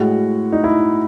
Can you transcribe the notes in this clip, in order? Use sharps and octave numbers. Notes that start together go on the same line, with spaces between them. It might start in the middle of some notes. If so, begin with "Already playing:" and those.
Already playing: A2 G#3 F#4
D#4
E4